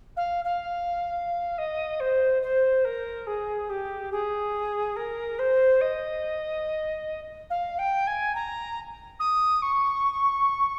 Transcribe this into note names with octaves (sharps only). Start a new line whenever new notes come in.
F5
F5
D#5
C5
C5
A#4
G#4
G4
G#4
A#4
C5
D#5
F5
G5
G#5
A#5
D#6
C#6